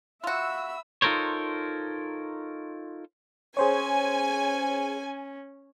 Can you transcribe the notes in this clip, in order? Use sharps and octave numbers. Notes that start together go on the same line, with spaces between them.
F4 F#4 E5 B5 E6
D#4 F4 A4 A#4 C5 C#5
C#4 G#4 C5 C#5 G#5